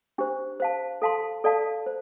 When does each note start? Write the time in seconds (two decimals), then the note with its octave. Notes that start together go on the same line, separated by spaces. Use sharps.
0.18 D4 G4 C5
0.60 C5 F5 A5
1.02 A4 F5 A5 C6
1.44 A4 D5 F5 A5
1.86 C5